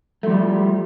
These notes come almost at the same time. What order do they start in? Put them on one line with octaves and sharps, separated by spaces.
A3 F3 G3